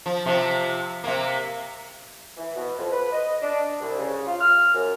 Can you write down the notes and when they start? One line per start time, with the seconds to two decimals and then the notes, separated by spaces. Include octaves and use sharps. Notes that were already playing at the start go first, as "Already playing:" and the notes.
0.06 F3
0.26 C3 F3
1.04 C3 A#3
2.37 E3
2.55 B2
2.78 F2
2.91 B4
3.12 D#5
3.42 D4
3.80 C2
3.98 C#3
4.27 F4
4.40 F6
4.74 F#2